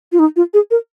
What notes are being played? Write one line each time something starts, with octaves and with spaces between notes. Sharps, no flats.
F4
D#4
F4
G#4
A#4